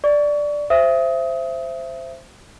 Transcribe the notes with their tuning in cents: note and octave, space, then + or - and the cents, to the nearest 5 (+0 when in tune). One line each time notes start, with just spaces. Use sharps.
D5 +0 C#6 +35
C5 +0 E5 +25 D#6 +25